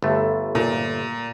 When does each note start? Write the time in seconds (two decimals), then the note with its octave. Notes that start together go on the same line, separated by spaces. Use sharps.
0.02 G1 A3
0.55 A#2